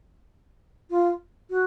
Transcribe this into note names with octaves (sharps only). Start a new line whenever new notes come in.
F4
F#4